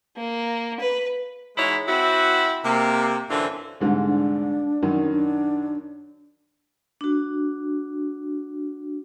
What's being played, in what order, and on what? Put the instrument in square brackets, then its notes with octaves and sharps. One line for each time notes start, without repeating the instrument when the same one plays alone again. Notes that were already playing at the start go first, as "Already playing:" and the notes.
[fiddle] A#3
B4
[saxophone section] E3 G#3 D#4 E4 F#4 C#5
C4 E4 F#4
C3 A#3
F#2 D3 E3 C4 D4 F4
[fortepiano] C2 G#2 D3
[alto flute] D4
[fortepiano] F#2 D#3
[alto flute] D4
[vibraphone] D4 F#4